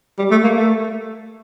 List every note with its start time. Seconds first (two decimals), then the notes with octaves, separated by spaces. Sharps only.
0.18 G3
0.31 A3
0.43 A#3
0.56 A3